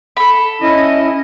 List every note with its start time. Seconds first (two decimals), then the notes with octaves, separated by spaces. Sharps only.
0.17 A4 B5
0.62 C#4 E4 D#5